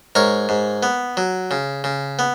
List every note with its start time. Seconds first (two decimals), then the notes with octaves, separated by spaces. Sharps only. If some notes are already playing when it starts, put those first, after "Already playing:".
0.15 G#2 A#4 C#5
0.49 G#2
0.83 B3
1.17 F#3
1.51 C#3
1.84 C#3
2.19 B3